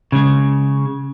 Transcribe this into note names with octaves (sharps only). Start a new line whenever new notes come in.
C#3 G#3